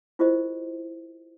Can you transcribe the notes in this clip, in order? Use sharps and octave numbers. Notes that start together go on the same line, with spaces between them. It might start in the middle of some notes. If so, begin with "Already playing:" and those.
E4 F4 G4 A#4 C5 D#5